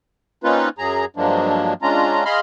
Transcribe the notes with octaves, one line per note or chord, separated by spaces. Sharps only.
A#3 C4 C#4 D#4 F4 B4
F#2 F#3 G#4 A#5
G2 F3 F#3 G#3 A#3 D4
G#3 C#4 D4 F4 A#5
G#4 D#5 F5 B5 C6 F6